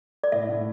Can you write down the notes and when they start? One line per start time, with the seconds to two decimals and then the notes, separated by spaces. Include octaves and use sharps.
0.24 D5
0.32 A2 E5
0.49 A2